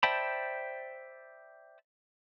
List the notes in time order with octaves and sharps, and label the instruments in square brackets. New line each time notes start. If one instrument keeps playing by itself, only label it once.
[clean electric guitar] C5 D5 E5 G5 A5 B5